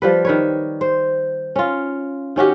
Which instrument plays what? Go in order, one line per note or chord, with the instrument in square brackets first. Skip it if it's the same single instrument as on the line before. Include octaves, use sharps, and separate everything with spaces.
[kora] F3 G3 B4
D#3 B4 C#5
C5
C#4 F4
D#3 C#4 F#4 G4